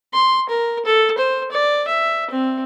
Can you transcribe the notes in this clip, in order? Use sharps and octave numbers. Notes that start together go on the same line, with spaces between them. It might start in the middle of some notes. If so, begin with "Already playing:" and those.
C6
A#4
A4
C5
D5
E5
C4